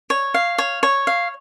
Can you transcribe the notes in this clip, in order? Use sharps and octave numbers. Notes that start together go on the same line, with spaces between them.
C#5
F5
C#5
C#5
F5